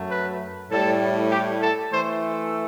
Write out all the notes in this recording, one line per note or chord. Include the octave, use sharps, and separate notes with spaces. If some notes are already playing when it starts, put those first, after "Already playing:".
Already playing: F#2 F#3 A3
B4
A2 G3 A4
G4
A4
E3 A3 C5